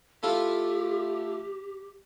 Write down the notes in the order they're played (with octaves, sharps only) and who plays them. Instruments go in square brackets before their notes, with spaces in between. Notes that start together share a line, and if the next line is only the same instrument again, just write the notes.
[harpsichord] A3 E4 F4 [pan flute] G4